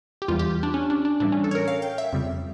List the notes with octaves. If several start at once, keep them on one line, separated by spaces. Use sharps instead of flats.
G4
E2 E3 G3 F4
G4
D4
C#4
D4
D4
A2 E3 G3 D4
C#4
A4
C#5
A#4
F5
G5
E5
F2 C#3 G3